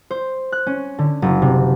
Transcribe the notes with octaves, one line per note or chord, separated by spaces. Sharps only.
C5
F#6
C#4
D3
F#1
C3